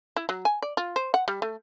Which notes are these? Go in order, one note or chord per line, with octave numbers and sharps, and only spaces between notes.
E4
F#3
G#5
D5
F4
C5
F#5
G3
A3